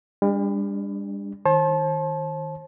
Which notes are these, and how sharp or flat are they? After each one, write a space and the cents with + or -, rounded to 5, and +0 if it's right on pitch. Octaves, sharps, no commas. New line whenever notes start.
G3 +40 D4 -5
D#3 +0 C5 +40 A5 -25